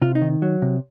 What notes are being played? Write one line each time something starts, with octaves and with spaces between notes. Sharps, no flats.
C3 F4
D#4
D#3
F#3
C3